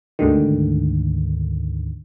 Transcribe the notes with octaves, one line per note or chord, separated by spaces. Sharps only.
D2 G#2 D3 D#3